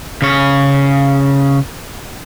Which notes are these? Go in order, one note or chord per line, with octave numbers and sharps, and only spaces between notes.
C#3 C#5